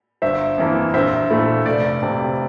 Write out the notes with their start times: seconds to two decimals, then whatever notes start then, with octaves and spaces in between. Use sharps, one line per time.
0.22 G1 C5 E5
0.58 F2 E3 A#3
0.94 A#1 C5 E5
1.30 A#2 A3 E4
1.66 F1 D5
2.02 F2 C3